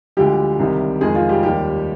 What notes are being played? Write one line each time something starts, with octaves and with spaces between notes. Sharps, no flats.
D2 D3 F3 G3 G#3 G4
C2 C3 D#3 G3
F2 D#3 G#3 G#4
F3 F4
G3 G4
D#2 D#3 G3 G4